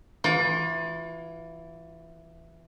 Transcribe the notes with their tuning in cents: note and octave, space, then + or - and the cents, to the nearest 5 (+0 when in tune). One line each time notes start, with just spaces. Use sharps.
E3 +5 F4 +35